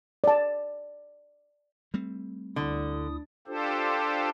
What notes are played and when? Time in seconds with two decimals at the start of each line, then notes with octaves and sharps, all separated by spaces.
0.24 D5 A5
1.94 G3 A3 C4
2.56 D2 D3 E4 D#6
3.47 D4 F4 G4 A4 C5